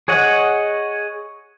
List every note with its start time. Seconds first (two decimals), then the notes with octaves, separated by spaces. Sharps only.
0.08 G#4 C#5 D#5 F#5